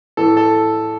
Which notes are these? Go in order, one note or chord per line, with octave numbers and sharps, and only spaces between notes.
A2 E3 A4
A4